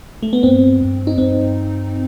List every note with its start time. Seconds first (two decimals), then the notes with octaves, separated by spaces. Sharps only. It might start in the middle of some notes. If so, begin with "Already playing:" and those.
0.23 A3
0.33 B3
0.43 G2 C4
0.80 G2
1.07 D#4
1.18 G2 C4